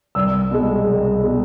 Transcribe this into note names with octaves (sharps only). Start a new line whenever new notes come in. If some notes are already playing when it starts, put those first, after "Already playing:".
C2 E6
B2 G#3
C2
B2 G#3